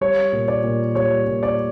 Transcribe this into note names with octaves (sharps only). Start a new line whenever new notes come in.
G3 C#5
A#2
D5
A#2
G3 C#5
A#2
D5